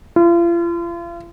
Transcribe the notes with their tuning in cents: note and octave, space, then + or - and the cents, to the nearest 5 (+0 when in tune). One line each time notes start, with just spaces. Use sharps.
F4 -40